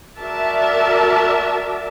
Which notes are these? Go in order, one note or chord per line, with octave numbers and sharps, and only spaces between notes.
F#4 A#4 D5 E5 A5